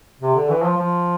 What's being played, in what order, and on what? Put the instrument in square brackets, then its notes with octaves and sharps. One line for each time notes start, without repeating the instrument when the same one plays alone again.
[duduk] C3
D3
E3
F3
F3